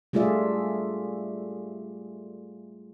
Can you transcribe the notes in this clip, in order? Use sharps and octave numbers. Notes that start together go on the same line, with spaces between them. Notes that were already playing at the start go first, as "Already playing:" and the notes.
G3 A3 F4 G#4 D5 E5